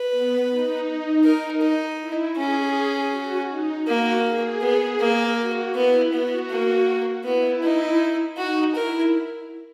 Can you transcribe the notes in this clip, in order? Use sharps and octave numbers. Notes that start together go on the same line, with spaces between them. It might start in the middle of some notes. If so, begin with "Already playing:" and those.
Already playing: B4
B3
D#4
A#4
D#4
E4
C#4 G#4
F#4
D#4
A#3 F#4
G#4
B3
A#3
F#4
B3 E4
B3 F#4
A#3
B3 E4
D#4
D#4 F#4
E4 A#4